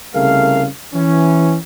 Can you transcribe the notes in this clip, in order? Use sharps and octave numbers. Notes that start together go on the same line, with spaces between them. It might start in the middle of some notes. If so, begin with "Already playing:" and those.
C2 C#3 A3 G#4 A#4 F5
E3 C#4